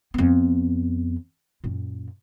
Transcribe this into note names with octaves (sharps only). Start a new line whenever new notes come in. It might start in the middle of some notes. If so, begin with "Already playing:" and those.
F2 B3
F#2 A#2